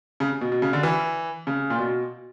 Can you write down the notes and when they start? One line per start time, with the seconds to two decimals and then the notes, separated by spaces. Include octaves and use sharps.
0.20 C#3
0.41 B2
0.52 B2
0.62 C#3
0.73 D3
0.83 E3
1.47 C#3
1.70 A#2
1.78 B2